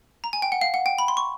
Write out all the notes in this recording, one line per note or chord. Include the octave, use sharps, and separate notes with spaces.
A#5
G#5
G5
F#5
F5
F#5
G5
B5
C6
C#6